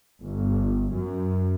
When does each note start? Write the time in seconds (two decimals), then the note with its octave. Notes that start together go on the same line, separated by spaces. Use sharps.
0.21 G1
0.93 F#2